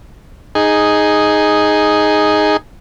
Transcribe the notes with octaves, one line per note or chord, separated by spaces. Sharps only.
D#4 G#4